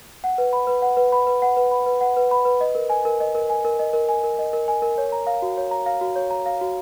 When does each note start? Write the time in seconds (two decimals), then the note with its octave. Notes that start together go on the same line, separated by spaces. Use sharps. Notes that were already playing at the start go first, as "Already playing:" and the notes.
0.24 F#5
0.38 B4
0.53 B5
0.67 B4
0.82 F#5
0.97 B4
1.12 B5
1.27 B4
1.42 F#5
1.57 B4
1.71 B5
1.86 B4
2.01 F#5
2.17 B4
2.31 B5
2.45 B4
2.61 D#5
2.75 A#4
2.89 G#5
3.05 A#4
3.20 D#5
3.35 A#4
3.50 G#5
3.65 A#4
3.79 D#5
3.93 A#4
4.09 G#5
4.24 A#4
4.39 D#5
4.53 A#4
4.68 G#5
4.82 A#4
4.98 C#5
5.12 A#5
5.27 F5
5.42 F#4
5.57 C#5
5.71 A#5
5.86 F5
6.01 F#4
6.16 C#5
6.30 A#5
6.46 F5
6.61 F#4